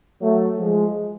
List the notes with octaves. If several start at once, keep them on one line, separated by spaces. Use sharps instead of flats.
F#3 A3
F3 G#3